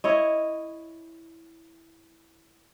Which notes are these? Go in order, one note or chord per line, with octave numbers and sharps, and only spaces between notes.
E4 C#5 D#5